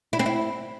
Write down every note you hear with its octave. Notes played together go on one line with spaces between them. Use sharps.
E4
C4
E4